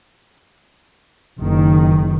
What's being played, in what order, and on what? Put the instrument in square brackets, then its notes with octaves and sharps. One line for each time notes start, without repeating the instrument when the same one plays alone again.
[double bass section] F#1 D#3